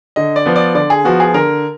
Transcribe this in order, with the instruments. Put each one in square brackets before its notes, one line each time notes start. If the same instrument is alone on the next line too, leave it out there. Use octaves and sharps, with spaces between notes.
[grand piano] D3 D#5
D5
F3 B3
D5
D3 D5
G#4
F3 B3 F#4
G#4
D3 A#4